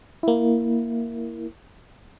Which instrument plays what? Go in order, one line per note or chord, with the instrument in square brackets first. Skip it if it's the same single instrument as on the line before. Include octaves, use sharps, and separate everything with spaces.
[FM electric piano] A#3 E4